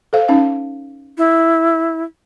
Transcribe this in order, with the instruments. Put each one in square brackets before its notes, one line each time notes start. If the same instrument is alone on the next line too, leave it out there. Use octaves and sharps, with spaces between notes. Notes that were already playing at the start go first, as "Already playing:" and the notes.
[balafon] A4 C5 F5
C#4 D#4 F5
[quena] E4